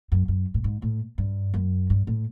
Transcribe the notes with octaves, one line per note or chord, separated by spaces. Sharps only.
F#2
F#2
A2
G#2
A2
G2
F#2
G2
A2